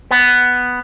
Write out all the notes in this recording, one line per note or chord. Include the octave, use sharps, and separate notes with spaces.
B3